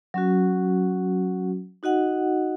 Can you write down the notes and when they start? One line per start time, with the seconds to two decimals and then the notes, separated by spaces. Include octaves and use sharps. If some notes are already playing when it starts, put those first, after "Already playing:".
0.14 F#3 C#4 F#4
1.83 D#4 F#4 D#5 F#5